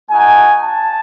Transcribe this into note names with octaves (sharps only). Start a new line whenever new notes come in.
A3 D#4 F#4 G#5
A5